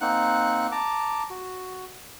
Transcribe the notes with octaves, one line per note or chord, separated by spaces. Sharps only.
A#3 C4 D#4 F#5 F#6
A5 A#5 D6
F#4